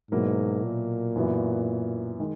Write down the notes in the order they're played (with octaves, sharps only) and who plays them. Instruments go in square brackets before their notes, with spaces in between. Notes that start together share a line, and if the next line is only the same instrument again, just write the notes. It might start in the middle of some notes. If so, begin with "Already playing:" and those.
[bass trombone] G#2 [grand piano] B2 F#3 A#3 E4
[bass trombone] A#2
[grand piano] F#2 E3 B3 F#4
D#3 G#3